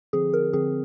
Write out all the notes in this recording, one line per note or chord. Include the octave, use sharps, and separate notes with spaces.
D3 F3 C4 G#4
A#4
D3 F3 C4 G#4